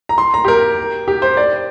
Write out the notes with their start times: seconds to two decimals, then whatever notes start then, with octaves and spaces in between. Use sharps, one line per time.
0.09 A#5
0.18 C6
0.34 A#5
0.45 G4
0.48 A#4
1.08 G4
1.22 C5
1.37 D5